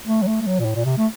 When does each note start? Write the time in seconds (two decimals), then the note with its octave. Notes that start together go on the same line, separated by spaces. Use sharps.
0.07 A3
0.22 F#3
0.28 A3
0.41 A3
0.47 F#3
0.60 A#2
0.65 A2
0.75 A#2
0.85 C3
0.98 A3